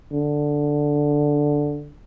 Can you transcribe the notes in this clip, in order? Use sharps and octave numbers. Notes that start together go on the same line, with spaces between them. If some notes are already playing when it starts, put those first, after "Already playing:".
D3